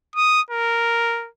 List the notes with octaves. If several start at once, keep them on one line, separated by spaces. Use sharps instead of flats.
D#6
A#4